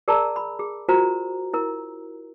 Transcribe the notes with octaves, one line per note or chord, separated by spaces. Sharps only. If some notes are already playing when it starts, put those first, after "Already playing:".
G#4 A#4 D5 A5 A#5 E6
B5
G#4
F4 F#4 A#4 C5 A#5
E4 A#4